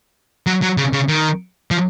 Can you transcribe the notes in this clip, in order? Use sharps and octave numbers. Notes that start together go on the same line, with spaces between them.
F#3
F#3
C#3
C#3
D#3
F3